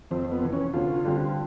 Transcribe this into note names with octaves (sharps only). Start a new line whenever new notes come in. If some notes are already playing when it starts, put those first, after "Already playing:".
F2 C4
B3
C3 E3
C#4
D2 F4
D3 G3 C4